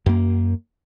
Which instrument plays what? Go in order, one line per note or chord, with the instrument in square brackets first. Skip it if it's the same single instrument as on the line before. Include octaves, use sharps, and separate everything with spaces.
[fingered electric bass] F#2 A#3